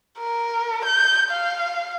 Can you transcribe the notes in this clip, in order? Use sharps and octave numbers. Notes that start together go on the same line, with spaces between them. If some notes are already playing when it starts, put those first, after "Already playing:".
A#4
G6
F5